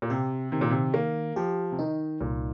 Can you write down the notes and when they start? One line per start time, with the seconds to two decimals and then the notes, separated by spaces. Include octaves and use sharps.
0.02 A#2
0.10 C3 G4
0.52 C3 D#3
0.61 A#2
0.70 C3
0.94 D#3 A#3
1.36 F3 G4
1.72 C3
1.79 D#3 D#4
2.21 C2 A#2